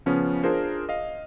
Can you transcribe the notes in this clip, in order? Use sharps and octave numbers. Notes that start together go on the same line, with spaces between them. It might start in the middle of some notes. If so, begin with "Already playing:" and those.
C#3 F3 B3 C#4
D4 F4 G#4 A#4 C5
D#5 F5